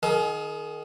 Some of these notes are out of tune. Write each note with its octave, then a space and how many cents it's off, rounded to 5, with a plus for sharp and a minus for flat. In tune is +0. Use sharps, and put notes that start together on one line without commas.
D#3 -5 G#4 +30